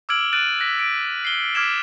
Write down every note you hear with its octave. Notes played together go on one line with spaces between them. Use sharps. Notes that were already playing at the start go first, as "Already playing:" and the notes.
D6 E6 F6 G#6 D7 F#7
F6 F#6 A6 D7 D#7 F#7
F#6 A#6 B6
D7
C7 G7
D6 F6 G#6 B6 D7 E7